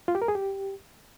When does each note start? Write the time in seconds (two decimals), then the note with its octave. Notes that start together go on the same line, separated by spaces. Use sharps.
0.08 F4
0.15 G4
0.22 A#4
0.28 G#4
0.35 G4